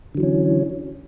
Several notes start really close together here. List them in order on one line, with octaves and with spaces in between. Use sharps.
D3 F#3 E3 C#4